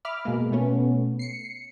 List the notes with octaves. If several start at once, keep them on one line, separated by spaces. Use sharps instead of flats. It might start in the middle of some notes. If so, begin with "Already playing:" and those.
E5 B5 D6 F6
B2 G#3 A#3
B2 A3 B3 C#4
C7 C#7